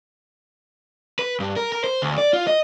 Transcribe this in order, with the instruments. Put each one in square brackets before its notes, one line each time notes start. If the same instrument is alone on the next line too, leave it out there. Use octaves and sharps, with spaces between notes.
[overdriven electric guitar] B4
G2
A#4
A#4
C5
D2
D5
F4
D#5